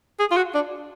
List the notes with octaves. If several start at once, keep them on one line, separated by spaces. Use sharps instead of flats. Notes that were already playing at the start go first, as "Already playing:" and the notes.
G#4
F4
F#4
D4